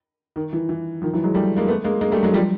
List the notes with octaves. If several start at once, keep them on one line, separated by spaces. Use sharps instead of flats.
D#3
E3
E3
D#3 F3
E3 F#3
F#3 G#3
G3 A3
G#3 A#3
A3 B3
G#3 A#3
G#3 A#3
G3 A3
F#3 G#3
F3 G3